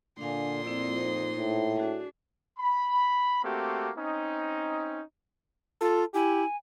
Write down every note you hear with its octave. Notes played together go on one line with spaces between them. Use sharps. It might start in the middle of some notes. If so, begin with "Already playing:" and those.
A#2 D3 D4 F5 G#5 C6 D#6
F2 C4 E4 D5
D#4 C5
A2
D4 F#4 G#4
B5
A3 A#3 C4 F#4 G4
C4 C#4 D#4
F4 A4
E4 G4 G#5